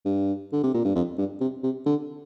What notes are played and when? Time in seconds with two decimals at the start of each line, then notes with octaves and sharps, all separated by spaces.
0.05 G2
0.52 D3
0.63 C3
0.74 A#2
0.84 G2
0.95 F2
1.18 G2
1.41 C3
1.63 C3
1.86 D3